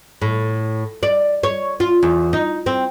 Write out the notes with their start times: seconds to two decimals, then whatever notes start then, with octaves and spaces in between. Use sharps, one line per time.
0.22 A2
1.03 D5
1.43 C#5
1.80 F4
2.03 E2
2.33 D#4
2.66 C4